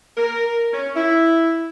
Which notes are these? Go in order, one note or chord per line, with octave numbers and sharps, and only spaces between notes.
A#4
C#4
E4